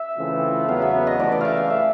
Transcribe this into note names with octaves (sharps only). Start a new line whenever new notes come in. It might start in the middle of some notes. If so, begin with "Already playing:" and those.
Already playing: E5
C#3 E3 A3 C4 F4
E2 C#3 F#3 B3 F5
E5
D#5
C#2 C3 E3 A3 D5
D5
E5 F5
F5
E5